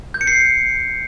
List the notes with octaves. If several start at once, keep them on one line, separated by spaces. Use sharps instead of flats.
G6
C#7
C7